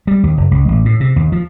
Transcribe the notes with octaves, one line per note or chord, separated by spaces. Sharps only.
G3
D#2
F#1
C#2
A1
A2
C3
D#2
F3